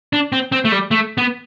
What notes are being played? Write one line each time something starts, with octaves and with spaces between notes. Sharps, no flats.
D4
C4
C4
A3
G3
A3
B3